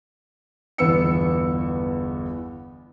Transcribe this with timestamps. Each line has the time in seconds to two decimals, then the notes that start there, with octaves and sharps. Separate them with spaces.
0.78 G1 E2 B3 E6 C#7